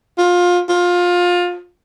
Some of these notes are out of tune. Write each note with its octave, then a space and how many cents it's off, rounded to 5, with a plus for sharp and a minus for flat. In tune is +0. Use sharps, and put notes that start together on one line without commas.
F4 +25
F4 +20